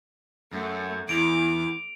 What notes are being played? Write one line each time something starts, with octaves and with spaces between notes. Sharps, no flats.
F#2 A3 F#5
E2 E4 D6 D7 F7